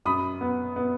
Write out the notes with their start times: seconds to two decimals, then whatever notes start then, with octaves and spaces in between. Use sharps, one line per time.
0.05 F#2 B5 D#6
0.41 B3
0.76 B3